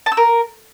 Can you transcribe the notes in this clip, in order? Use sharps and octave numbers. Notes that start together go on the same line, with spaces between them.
A5
E6
A#4